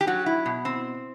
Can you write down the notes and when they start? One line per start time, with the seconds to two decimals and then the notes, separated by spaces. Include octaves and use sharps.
0.01 G4
0.07 F#3 F#4
0.26 E4
0.46 B2
0.65 C4